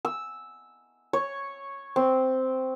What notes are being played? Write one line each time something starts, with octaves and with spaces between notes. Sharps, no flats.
E6
C#5
C4